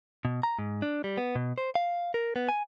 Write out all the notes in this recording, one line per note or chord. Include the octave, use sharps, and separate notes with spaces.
B2
A#5
G#2
D4
G3
B3
B2
C5
F5
A#4
B3
G#5